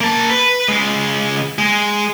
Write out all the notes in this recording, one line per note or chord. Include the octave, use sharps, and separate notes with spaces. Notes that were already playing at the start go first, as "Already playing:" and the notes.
A#3 A5
B4
C#2 G#3
G#3